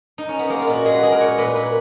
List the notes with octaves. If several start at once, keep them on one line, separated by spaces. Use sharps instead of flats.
D#4
C#4
B3
G#3 A#3
F4
A#2
F#4
G#3 G#4
B4
G#3 G#4
A#4
A#2 C#5
A#2 B4
A#2 B4